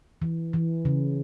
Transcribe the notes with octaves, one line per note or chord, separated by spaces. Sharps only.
E3
E3
C#3